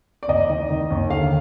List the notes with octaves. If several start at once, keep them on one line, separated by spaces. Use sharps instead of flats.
D5
D#2 D#5
D#3
D#3
D#2
D3 F5